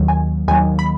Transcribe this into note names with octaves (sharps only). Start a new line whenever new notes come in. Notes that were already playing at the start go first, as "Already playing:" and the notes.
Already playing: D#2 D#3 F#3
G#5
D#2 D#3 F#3 G#5
B5